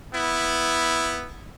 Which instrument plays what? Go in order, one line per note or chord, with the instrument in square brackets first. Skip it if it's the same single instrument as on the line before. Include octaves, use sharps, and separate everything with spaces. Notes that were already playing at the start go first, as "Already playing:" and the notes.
[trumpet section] B3 E4